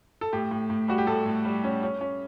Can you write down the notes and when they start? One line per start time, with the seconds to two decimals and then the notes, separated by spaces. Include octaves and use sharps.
0.21 A4
0.33 A2 G4
0.51 A2
0.70 A2
0.88 G3 F#4
0.98 G4
1.07 A2 A4
1.26 A2
1.45 G3
1.64 C#4
1.83 C#4
2.01 C#4